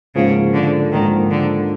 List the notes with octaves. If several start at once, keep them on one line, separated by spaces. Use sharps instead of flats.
G#2 C#3 F3 A#3
D3
G#2 D#3 F3 A#3
D3